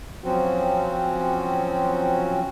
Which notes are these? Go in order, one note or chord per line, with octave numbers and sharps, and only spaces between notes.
F3 F#3 C4 C#4 F#4